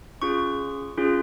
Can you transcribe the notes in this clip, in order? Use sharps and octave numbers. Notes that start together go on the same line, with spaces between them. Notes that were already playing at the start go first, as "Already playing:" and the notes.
C#4 F4 G#4 C#6
C#4 F4 G#4